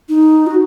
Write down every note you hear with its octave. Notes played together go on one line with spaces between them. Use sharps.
D#4
F#4